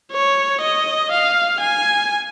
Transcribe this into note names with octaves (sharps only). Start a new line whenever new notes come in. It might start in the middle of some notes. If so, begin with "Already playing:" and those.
C#5
D#5
F5
G#5